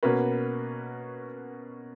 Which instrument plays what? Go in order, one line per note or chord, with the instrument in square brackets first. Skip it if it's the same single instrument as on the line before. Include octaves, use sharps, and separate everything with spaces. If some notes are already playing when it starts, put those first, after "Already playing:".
[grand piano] B2 A#3 C#4 F#4 B4